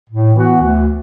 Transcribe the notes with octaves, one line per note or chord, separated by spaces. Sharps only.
A2
E3 B3 F#4
D2